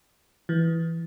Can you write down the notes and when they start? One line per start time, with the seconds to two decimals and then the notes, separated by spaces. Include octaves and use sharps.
0.49 E3